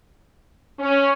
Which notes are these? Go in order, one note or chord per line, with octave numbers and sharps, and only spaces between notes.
C#4